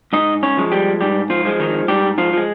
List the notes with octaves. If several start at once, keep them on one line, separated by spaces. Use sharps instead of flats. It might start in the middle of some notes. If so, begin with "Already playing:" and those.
G#2 D#4 D#5
C#4 C#5
F3 G#3
G3 G4
G#2 G3 G4
F3 F4
F3 G#3
D#3 D#4
G#2 G3 G4
F3 F4
F3 G#3